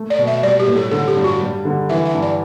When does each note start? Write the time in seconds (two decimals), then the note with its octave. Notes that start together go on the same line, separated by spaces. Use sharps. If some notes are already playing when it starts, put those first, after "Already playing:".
Already playing: A3
0.10 D5
0.19 B2
0.27 E5
0.43 G3 D5
0.60 G4
0.67 A2
0.76 A4
0.91 D3 A4
1.08 G4
1.16 G2
1.24 F#4
1.41 G3
1.65 D3
1.89 E3 E5
2.05 E5
2.14 G2
2.22 D5